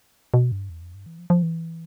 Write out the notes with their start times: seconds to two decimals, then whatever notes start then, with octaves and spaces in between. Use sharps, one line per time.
0.34 B2
0.52 G2
0.70 E2
0.82 F2
0.94 G2
1.06 E3
1.19 F3
1.30 F3
1.43 E3